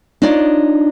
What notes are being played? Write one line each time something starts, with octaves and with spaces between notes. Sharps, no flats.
D4 D#4 F4 C#5 D5